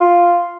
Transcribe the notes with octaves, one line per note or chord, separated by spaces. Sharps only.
F4